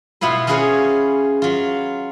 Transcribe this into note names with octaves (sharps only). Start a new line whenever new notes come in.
B2 B3 E4 F4 B4
C#4 F4 F#4 G#4 B4 C#5
F#3 F4